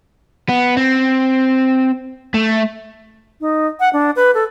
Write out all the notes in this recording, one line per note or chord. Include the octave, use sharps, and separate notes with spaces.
B3
C4
A3
D#4
F#5
D4
B4
A4